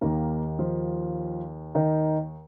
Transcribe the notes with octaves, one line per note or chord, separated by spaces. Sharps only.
D#2 D#3 A#3 A#4
F3 F4
D#3 D#4